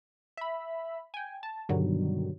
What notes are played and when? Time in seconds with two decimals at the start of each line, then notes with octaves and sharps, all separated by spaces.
0.37 E5 B5
1.14 G5 G#5
1.43 A5
1.69 G2 B2 D3 D#3 F#3 G3